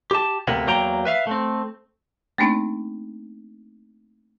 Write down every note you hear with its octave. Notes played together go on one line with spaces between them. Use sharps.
G4 A5
D2 C3 A#3 B3
E2 F#3 A#3 G5 A#5
B4 E5 F5
A3 C4
A3 A#3 C4 D4 D#4